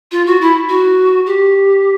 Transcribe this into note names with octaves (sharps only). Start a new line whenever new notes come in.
F4
F#4
E4
F#4
G4